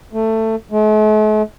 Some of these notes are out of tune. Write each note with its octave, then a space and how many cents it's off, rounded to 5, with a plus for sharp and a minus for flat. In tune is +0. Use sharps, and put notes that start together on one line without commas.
A3 +15
A3 -45